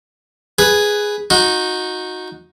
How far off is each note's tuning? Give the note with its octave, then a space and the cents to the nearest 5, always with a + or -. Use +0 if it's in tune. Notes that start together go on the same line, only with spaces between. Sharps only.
G#4 +0 B4 +0
D#4 +5 F#4 -25